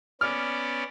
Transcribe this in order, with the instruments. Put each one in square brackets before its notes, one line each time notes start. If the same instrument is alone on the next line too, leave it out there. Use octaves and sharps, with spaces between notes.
[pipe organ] B3 C#4 D5 [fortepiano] F6